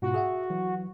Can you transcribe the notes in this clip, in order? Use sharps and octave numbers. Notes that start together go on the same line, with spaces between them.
G#2 B2 F4 F#4
G#4 E5 F#5
E3 F#3